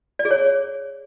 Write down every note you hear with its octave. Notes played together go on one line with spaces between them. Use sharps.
D5
G#4
C#5